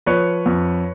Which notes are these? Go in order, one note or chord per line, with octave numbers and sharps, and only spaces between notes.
F3 B4 C#5
F2